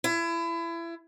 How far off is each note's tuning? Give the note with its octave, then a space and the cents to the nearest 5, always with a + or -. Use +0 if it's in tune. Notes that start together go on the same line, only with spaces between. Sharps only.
E4 +30